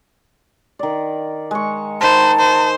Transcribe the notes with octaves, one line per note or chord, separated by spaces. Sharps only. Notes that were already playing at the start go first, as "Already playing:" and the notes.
D#3 D5
G#3 C#6
D#3 C5 A5 B5
C5